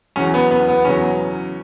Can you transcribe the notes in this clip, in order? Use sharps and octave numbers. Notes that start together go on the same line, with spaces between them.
E2 C#3 F#3 C#4
B3
B3
B3
E2 C#3 F#3 C#4